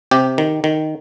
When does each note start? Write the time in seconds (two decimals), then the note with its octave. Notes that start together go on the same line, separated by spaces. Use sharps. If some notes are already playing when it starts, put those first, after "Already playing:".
0.11 C3 G4
0.38 D#3
0.64 D#3